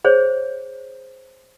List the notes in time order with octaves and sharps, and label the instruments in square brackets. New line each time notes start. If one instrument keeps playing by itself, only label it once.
[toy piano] G#4 C5 C#5